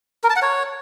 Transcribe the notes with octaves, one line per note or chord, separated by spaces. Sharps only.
A#4
A5
F#5
C#5